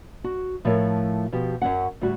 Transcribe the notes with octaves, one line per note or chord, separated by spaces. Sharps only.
F#4
A2 F3 A3 E4 A#4 C#5
B2 F3 G4
F#2 F#3 C#4 F#5
D2 A2 G3 F#4